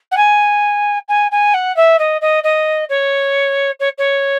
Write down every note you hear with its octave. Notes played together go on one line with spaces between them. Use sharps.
F#5
G#5
G#5
G#5
F#5
E5
D#5
D#5
D#5
C#5
C#5
C#5